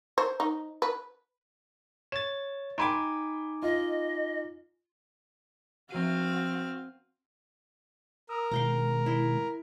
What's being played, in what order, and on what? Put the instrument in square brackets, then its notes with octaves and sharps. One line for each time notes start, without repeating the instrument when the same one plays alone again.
[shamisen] C5
D#4
B4
[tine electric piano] C#5 A6 [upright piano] E7
[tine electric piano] D#4 G#5 D6 [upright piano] G5 B5 C6
[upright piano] F4 [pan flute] D#5
[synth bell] F3 D#7 [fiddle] C4 F5 [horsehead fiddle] F#4
[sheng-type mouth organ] A#4 [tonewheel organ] D#6 E6
[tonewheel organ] B2 D#3 G#3 [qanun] F5 G5 A#5
[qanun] E4 C6